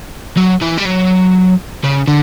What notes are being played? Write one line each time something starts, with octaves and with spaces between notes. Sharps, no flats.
F#3
E3
G3
F#3
C#3
D3